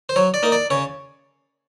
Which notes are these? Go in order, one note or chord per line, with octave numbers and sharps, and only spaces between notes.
C5
F#3 C#5
D5
A#3 D#4
D5
C#3 C#5